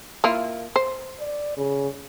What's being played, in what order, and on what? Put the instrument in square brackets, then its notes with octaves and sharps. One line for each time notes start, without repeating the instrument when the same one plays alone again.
[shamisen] A#3 E4 F4
C5
[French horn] D5
C#3